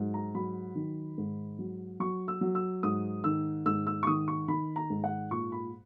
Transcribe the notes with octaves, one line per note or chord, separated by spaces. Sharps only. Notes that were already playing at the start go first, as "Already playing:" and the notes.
Already playing: G#2 F#3
A#5
F#3 B5
D#3
G#2
F#3
F#3 C#6
E6
F#3
E6
G#2 D#6
D#3 E6
G#2 E6
E6
C#6
D#3 D#6
C#6
D#3 B5
A#5
G#2
F#5
A#2 C#6
B5